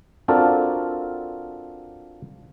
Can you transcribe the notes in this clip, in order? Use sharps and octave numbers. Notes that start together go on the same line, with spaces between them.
C4 D4 F4 F#4 A4 A#4